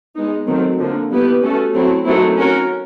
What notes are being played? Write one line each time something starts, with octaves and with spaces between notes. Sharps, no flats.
G#3 B3 D#4
D#3 F#3 A3 C4
D3 F3 A#3
G3 B3 E4 G4 B4
A3 C#4 F#4 A4
F#3 A3 C4 E4
D#3 F#3 A3 C4 E4
C#4 F#4 A#4